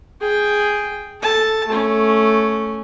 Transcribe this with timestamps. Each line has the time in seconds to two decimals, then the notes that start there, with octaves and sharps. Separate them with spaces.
0.21 G#4 G5
1.21 A4 A5
1.68 A3 C#4